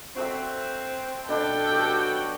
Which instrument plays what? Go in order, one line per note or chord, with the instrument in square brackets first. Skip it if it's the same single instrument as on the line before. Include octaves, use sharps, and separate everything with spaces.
[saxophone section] C4 [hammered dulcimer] F#4 A4 E5
[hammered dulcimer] B2 D4 [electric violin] A4 G5
[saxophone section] B2 F#3 F#4 [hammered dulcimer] G4